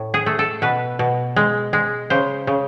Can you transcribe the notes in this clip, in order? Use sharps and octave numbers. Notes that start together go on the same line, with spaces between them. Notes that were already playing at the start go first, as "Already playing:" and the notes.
Already playing: A2
G#4
A3
A4
B2 B4
B2
G#3
G#3
C#3 C5
C#3